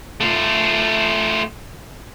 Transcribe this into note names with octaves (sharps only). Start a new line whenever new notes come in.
A3 F4